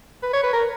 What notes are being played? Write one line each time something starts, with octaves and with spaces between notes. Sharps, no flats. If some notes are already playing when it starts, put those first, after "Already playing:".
B4
C#5
B4
A#4